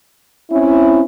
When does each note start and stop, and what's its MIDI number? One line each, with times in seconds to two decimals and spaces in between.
0.51 1.03 60
0.51 1.03 61
0.51 1.03 64